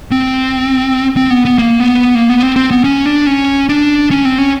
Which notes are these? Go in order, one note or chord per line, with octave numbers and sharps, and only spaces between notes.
C4
C4
B3
B3
A#3
B3
A#3
B3
C4
C4
B3
C#4
D4
C#4
D4
C#4
C4
C#4